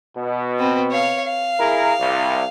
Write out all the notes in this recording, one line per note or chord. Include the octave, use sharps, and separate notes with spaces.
B2
C4 B4
C#5 F5
F5
E4 G#4 A#4
C2